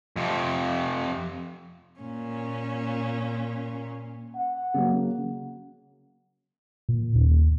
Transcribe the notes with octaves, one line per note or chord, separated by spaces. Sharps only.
F2 C3
A#2 C#4
F#5
C#3 F#3 A#3
A#2
D#2